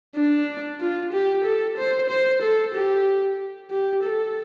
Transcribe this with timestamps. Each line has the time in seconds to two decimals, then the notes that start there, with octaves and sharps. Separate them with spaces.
0.16 D4
0.81 F4
1.13 G4
1.44 A4
1.77 C5
2.09 C5
2.42 A4
2.75 G4
3.71 G4
4.03 A4